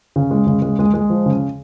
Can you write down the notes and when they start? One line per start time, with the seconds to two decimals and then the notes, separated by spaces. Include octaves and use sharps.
0.16 C#3
0.31 G#3
0.47 C#3
0.62 G#3
0.79 G#3
0.94 G#3
1.10 F3
1.26 C#3